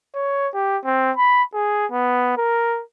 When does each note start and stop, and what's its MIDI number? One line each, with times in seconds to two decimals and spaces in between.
0.15 0.48 73
0.54 0.78 67
0.85 1.12 60
1.17 1.43 83
1.54 1.86 68
1.92 2.34 59
2.38 2.82 70